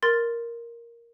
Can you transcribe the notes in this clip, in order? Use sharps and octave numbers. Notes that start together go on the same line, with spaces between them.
A#4 C6 A6